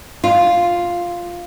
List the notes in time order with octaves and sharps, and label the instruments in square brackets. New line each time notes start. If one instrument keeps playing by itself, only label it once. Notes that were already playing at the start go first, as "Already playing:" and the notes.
[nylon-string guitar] F4